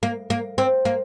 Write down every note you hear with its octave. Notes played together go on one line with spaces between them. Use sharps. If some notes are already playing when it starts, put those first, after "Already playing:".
A#3
A#3
C4
A#3